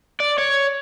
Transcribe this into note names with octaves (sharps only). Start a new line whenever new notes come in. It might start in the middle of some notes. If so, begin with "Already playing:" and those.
D5
C#5